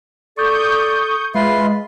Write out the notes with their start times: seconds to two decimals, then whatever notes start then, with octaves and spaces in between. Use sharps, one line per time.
0.37 A4 D5 C#6 D#6 G6
1.35 G#3 F4 B4 E5 C6